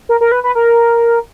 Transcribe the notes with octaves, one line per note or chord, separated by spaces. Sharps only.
A#4
A#4
B4
B4
A#4